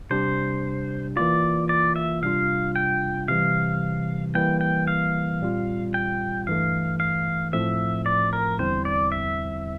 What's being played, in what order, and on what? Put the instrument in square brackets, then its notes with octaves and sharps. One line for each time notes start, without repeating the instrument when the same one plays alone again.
[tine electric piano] C3 G3 D4 G4 [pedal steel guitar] C5
[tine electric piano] E3 A#3 F4 [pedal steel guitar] D5
[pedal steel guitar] D5
E5
[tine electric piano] C3 G3 D4 F4 [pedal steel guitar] F5
[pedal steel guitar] G5
[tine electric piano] C3 E3 G3 [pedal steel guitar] F5
[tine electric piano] E3 G3 A#3 [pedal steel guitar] G5
[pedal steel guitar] G5
F5
[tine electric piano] A#2 G3 C4 F4
[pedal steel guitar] G5
[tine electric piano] G2 E3 A3 [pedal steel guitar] F5
[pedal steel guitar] F5
[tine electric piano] A2 F3 A3 C4 [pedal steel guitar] E5
[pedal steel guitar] D5
A#4
[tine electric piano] E2 D3 G3 C4 E4 [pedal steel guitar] C5
[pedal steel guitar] D5
E5